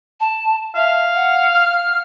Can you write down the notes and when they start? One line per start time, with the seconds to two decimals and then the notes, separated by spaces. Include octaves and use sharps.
0.20 A5
0.75 E5 F5
1.15 F#5
1.53 F6